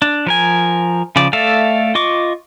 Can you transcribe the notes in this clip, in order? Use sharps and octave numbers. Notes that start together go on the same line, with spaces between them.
D4
F3 A#4 G#5
C#3 F3 D5
A3 A4 D5 E5 F5
F4 D#5 C#6 D6